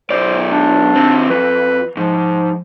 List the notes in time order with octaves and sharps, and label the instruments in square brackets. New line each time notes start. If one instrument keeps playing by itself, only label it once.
[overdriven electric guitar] B1 D5 [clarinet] C5
[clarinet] D4
[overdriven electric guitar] D#2 C4
[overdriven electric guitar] F2 [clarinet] B4
[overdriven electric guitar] G#2 [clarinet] F3